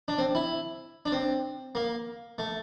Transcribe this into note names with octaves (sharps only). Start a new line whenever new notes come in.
D4
C4
E4
D4
C4
A#3
A3